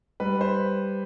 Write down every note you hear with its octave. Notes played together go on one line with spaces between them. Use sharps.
G3 B4
C5